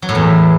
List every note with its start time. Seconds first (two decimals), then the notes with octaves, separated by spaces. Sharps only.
0.02 F#3
0.09 A2
0.15 E2